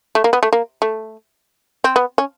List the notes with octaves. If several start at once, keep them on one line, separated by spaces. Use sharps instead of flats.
A3
A#3
B3
A3
A#3
A3
C4
B3
C#4